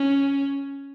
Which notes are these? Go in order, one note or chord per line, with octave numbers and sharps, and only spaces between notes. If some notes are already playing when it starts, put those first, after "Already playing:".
Already playing: C#4